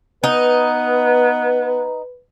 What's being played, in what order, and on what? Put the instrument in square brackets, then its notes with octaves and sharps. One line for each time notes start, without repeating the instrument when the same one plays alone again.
[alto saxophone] B3 [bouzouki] D#4 [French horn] B4